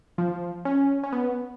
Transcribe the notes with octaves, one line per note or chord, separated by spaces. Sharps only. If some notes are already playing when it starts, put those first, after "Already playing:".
F3
C#4
C#4
B3